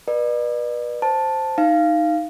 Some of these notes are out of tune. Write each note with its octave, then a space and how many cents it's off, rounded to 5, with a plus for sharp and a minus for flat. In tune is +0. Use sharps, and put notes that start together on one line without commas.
B4 -30 D5 +45
C5 +0 A5 +0
D#4 +0 F5 -15